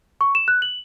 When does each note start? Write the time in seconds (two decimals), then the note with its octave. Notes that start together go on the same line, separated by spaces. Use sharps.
0.21 C#6
0.35 E7
0.48 F#6
0.62 F#7